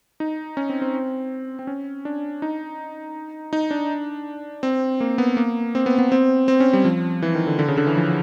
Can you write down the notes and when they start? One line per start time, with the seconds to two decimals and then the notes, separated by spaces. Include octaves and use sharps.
0.20 D#4
0.57 C#4
0.69 C4
0.82 C4
1.59 C4
1.67 C#4
2.05 D4
2.42 D#4
3.53 D#4
3.71 D4
4.63 C4
5.00 A#3
5.18 B3
5.37 A#3
5.75 C4
5.86 B3
5.98 B3
6.12 C4
6.48 C4
6.60 C#4
6.73 G3
6.85 F3
7.22 E3
7.35 D#3
7.47 D3
7.59 D3
7.68 C#3
7.78 D3
7.87 E3
7.97 F3